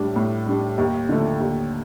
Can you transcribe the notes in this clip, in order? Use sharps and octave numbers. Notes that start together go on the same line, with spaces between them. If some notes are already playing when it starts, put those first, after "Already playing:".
Already playing: A2 G3 D4
A2
G3 D4
D#2
D3 F3 A3
D#2